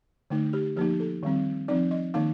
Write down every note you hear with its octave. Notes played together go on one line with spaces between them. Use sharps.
D3 A3 D#4
G4
F3 A#3 D#4 G4
A4
D#3 G3 C4
F3 C4 D#4 D5
D#5
D#3 A#3 D#4 F5